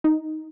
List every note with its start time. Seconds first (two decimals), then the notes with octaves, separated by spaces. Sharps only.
0.04 D#4